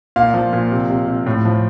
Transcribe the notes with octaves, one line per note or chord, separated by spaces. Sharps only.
A#2 F5
F3
A#2
C3
C3
C3
A2
F3